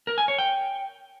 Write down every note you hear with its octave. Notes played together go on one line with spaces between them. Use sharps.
A#4
G#5
C#5
G5